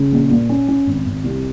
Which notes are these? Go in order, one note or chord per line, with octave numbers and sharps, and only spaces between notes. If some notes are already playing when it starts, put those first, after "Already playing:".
Already playing: C#3
A#1
A#2
C#4
C#4
G#1
G#1
C2